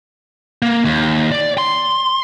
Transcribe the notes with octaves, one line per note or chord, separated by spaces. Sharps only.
A#3
D#2
D5
C6